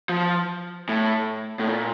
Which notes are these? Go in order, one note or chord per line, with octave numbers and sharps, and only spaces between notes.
F3
A2
A2
A#2